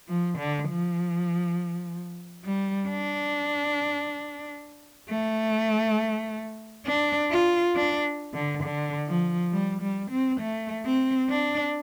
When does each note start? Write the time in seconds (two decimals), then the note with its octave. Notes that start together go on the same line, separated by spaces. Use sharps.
0.08 F3
0.38 D3
0.68 F3
2.45 G3
2.89 D4
5.09 A3
6.86 D4
7.31 F4
7.76 D4
8.34 D3
8.63 D3
9.08 F3
9.52 G3
9.81 G3
10.11 C4
10.40 A3
10.85 C4
11.29 D4